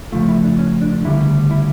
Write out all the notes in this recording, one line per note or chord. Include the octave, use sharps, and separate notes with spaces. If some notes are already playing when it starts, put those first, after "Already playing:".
F2 C#3 F3 A3 F4
E4
D4
C#4
D4
D2 C#3 G3 E4
E4